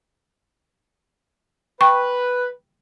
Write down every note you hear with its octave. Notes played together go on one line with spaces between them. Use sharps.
B4 G5 C#6